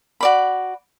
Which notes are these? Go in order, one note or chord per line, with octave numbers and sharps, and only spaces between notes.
F#4 D5 B5